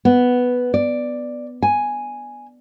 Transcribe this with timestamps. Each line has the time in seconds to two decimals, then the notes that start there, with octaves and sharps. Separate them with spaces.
0.05 B3
0.74 D5
1.63 G#5